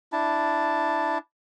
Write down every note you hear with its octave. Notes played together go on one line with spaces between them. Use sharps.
D4 E4 A5